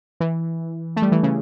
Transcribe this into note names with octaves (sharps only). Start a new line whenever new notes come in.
E3
A3
G3
E3
C#3